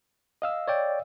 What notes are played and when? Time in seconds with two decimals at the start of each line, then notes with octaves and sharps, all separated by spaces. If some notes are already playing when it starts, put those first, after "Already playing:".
0.42 D#5 F5 E6
0.68 C#5 D5 G5